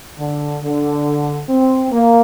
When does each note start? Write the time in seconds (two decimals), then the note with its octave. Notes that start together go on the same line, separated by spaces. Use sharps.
0.18 D3
0.63 D3
1.48 C4
1.92 A#3